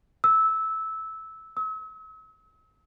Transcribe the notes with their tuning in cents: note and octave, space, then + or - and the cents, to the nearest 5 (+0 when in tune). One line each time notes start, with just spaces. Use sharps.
E6 -15
E6 -40